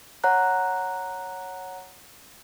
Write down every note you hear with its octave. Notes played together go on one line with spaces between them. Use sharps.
C#5 F#5 A#5 F#6